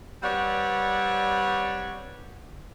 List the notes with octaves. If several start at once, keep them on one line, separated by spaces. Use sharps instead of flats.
G3 C4 B4 C#5 D5 F#5